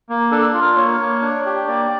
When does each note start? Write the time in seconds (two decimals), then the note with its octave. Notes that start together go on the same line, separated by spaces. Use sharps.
0.10 A#3
0.32 D4 A4
0.54 F4
0.61 A#4
0.76 A#3 C#5
1.00 A#3
1.22 D4
1.46 G4
1.68 A#3 D5